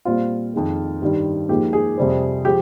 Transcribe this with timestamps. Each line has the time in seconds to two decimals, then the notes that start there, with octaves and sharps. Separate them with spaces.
0.05 A#2 G3 C4 F4
0.54 F2 D#3 G#3
1.02 G2 D#3 G3
1.49 G#2 F3 A#3 G4
1.73 G#4
1.97 F2 C3 G3 C4
2.45 F3 G#3 G4